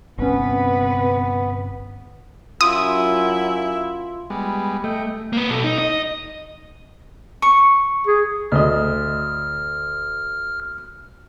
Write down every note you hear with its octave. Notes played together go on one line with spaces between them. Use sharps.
G1 C3 B3 C#4 B4
F#2 E4 F4 D#6
G3 G#3 B3
A3 D#5 G5
A#3 B4
B2 A4
D#4
D#5
C#6
G#4
D2 D#5 F6